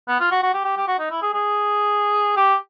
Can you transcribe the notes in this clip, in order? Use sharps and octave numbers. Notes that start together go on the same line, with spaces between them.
B3
F4
F#4
F#4
G4
G4
G4
F#4
D#4
E4
G#4
G#4
G4